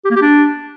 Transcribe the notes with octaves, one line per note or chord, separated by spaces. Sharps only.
G4
A#3
G4
D4